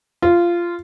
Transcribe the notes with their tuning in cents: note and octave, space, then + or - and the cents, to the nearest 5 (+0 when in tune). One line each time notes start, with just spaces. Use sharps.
F4 -15